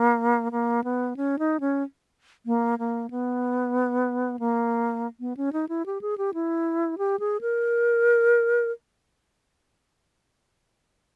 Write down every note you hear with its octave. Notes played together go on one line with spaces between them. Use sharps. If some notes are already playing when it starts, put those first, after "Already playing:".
Already playing: A#3
A#3
B3
C#4
D#4
C#4
A#3
A#3
B3
A#3
B3
C#4
D#4
E4
G4
G#4
G4
E4
G4
G#4
A#4